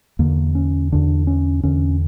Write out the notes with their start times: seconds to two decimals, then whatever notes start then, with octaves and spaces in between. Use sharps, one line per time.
0.19 E2 D3 A#3
0.55 C#4
0.92 E2 D3 D4
1.27 C#4
1.63 E2 D3 C#4